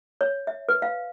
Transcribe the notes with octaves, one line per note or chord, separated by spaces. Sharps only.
C#5
E5
B4
F5